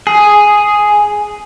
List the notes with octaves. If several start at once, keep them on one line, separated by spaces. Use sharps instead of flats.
G#4